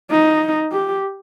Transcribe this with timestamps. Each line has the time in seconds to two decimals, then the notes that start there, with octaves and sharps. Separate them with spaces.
0.11 D#4
0.72 G4